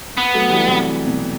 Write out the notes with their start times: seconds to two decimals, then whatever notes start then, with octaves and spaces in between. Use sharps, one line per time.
0.17 B3
0.34 F#3 A3
0.50 E3 G3
0.68 C3 E3
1.07 B2